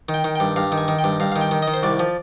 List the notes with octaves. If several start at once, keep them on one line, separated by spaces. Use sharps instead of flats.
D#3
G5
D#3
G2 G5
G2 F5
D#3
G#5
D#3
G5
G2
G2 F5
D#3 F5
G5
D#3
D#5
D#3
C5
C2 D5
F3